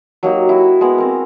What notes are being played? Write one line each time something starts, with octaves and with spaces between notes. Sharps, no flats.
F#3 A#3 D#4 G4
E4 F#4
G#3 B3
C4 A#4